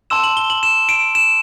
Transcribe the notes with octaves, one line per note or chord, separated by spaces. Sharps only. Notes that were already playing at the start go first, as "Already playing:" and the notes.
A5 C6 E6 E7
F#7
G7
F#7
E7
D7
E7